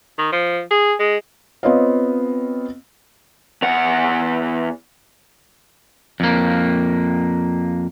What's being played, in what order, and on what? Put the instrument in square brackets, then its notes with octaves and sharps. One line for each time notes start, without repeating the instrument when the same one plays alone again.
[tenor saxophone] D#3
F3
G#4
G#3
[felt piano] B3 C4 F4 C#5 D#5 F5
[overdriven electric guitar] E2 F#5
[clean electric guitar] F2 A#3